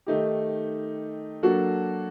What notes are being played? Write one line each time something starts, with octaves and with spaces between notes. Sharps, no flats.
D#3 A3 D#4 G4
F#3 A#3 D4 F#4 A4